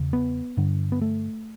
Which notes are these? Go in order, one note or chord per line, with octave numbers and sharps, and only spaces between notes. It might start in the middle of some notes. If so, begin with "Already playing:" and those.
Already playing: E2 C#3
B3
G2 D3
B3
A3